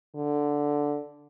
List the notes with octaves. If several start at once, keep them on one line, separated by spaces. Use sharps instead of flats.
D3